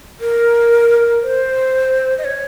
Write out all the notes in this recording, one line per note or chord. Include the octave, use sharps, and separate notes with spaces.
A#4
C5
D#5
C#5